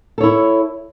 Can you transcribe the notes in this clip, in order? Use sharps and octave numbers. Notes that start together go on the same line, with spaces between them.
E4 A4 C#5